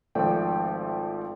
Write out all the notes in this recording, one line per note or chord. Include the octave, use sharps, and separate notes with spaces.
G#1 F3 A3 A4 D5 G5